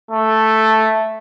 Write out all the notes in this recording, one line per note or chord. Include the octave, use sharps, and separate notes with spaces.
A3